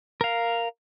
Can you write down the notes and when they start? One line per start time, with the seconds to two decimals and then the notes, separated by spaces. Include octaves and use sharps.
0.21 A#4 F5